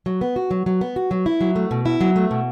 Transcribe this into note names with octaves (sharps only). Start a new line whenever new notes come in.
F#3
B3
F#4
F#3
F#3
B3
F#4
F#3
E4
F#3
A3
B2
E4
F#3
A3
B2